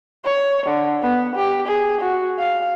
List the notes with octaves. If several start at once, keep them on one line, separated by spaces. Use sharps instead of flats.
C#5
D3
B3
G4
G#4
F#4
F5